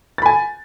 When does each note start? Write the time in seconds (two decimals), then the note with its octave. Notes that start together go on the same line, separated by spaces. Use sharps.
0.18 A6
0.22 B5
0.26 G#5